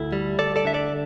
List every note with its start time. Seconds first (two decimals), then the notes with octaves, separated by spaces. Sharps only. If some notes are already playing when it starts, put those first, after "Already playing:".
Already playing: D2 E4 A4
0.12 G3
0.39 D2 A4 D5
0.56 A4 D5
0.65 D3 E5
0.74 A4 D5